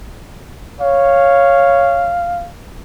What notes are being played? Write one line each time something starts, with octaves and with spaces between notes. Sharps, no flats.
C#5 F5